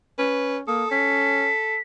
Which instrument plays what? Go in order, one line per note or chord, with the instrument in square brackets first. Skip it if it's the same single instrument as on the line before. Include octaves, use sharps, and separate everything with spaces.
[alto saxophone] C#4 [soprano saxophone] B4
[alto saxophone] A#3 [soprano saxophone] A4 [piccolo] D#6
[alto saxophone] C#4 [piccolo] B6